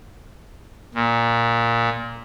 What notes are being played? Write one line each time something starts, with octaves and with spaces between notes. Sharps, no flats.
A#2